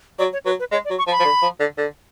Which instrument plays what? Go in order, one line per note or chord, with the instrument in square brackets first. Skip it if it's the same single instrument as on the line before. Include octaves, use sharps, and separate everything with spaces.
[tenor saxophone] F#3 [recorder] D5
[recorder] C#5
[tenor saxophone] F#3 [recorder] B4
[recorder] B4
[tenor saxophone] G#3 [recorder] C#5
[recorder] D5
[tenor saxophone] F#3
[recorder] C#6
[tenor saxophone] F3
[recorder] B5
[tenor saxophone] F3
D3
F3
D3
D3